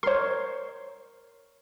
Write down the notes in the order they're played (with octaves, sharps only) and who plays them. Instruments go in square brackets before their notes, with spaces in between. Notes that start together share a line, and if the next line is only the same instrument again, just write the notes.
[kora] A#4 C#5 [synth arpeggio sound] C5 C6